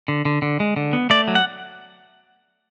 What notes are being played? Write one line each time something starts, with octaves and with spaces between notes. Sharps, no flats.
D3
D3
D3
G#3
D3
B3
A3 D5
F#3
F#5